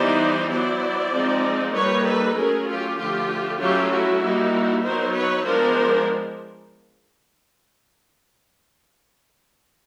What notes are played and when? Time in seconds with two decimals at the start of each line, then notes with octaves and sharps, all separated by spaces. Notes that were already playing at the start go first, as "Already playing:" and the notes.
Already playing: E3 G3 B3 D#4 C5 D5
0.50 F#3 B3 E4 C5 D5
1.13 F3 G#3 C4 D#4
1.74 G3 A#3 D#4 B4 C#5
2.05 A4 B4
2.36 F#3 A3 C#4 G#4 A#4
2.67 F4 G4
2.98 D3 F3 A3 F4 G4
3.60 F#3 A3 C#4 E4 F4 G4
3.91 E4 F#4
4.22 G3 A#3 D#4
4.84 F#3 B3 D#4 A#4 C5
5.15 B4 C#5
5.46 F3 G#3 B3 D4 A#4 C5